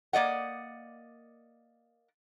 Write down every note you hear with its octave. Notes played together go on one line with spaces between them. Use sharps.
A#3 D5 D#5 F#5